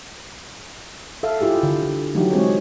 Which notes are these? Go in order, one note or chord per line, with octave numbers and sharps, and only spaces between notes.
A4 E5 F5
E4 F4 G4 G#4
D3
D3
E3 F#3 A3 D#4 F#4 G4
G#3 C4 G#4 C#5